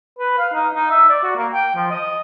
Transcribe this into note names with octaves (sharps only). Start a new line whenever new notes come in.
B4
F5
D#4
D#4
E5
D5
F#4
A#3
G5
F3
D#5